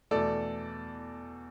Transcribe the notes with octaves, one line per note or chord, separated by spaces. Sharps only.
E2 B2 A3 A4 D5